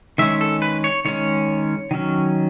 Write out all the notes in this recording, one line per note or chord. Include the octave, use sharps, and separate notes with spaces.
D#3 G#3 C#4 E5
A4
B4
C#5
D#3 G#3 C#4 C#5
D#3 F#3 C#4